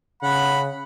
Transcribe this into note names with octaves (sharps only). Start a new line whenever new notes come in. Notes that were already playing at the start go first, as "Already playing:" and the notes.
C#3 F#5 B5